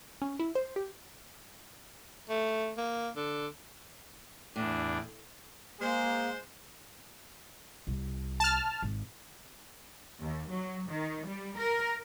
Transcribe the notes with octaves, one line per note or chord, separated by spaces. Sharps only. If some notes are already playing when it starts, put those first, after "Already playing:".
C#4
E4
C5
G4
A3
A#3
D3
E2 A2 D4
G#3 A#3 G#4 C5
C2
A5 F6
G#1
D#2
F#3
D#3
G3
A#4